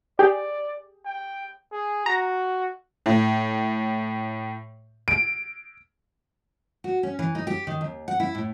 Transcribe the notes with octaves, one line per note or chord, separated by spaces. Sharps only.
G4 G#4 D5
G5
G#4
F#4 A#5
A2
D7
F#4
C#4
E3
D#4
G4
D#3
D#2
F#5
E4
A2